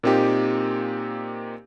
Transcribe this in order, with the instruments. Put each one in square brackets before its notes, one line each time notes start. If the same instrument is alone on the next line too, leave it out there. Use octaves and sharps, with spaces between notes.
[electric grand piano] A#2 A#3 C4 D#4 G4